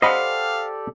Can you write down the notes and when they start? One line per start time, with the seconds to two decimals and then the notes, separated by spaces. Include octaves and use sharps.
0.02 G4 A4 C5 D5 D#5 F5 F#5 B5